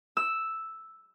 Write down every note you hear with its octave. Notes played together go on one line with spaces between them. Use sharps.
E6